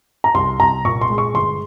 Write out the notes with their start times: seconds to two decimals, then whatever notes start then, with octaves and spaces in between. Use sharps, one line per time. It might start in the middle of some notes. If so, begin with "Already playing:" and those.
0.24 A#5
0.34 C2 C6
0.60 C2 A#5
0.84 A#2 C#6
1.01 C6
1.10 G#3
1.18 C#6
1.34 G1 C6